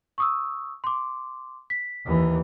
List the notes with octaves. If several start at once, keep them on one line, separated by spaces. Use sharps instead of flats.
C#6 D#6 E6
C6 D6
B6
D#2 E3